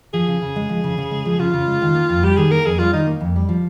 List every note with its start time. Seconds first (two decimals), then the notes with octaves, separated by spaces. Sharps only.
0.13 F3 G#4
0.28 C#3
0.42 C#3
0.56 G#3
0.69 F3
0.84 C#3
0.98 C#3
1.11 G#3
1.25 F3
1.39 C#3 F4
1.54 C#3
1.67 G#3
1.82 D#3
1.95 A#3
2.09 F2
2.23 G3 G4
2.37 D#3 G#4
2.51 A#3 A#4
2.65 F2 G#4
2.79 G3 F4
2.93 D#3 D#4
3.07 A#3
3.21 F2
3.36 G3
3.49 F3